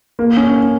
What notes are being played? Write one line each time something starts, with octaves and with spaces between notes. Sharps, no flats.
A#3
C#4